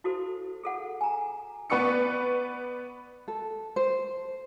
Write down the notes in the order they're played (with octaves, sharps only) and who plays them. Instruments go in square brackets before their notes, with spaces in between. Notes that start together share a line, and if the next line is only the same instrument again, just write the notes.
[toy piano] E4 F#4 A4 C5
G#4 A4 F#5
G#5 A#5
[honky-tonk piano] B3 B4 D5 C#6 C#7
[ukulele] A4
C5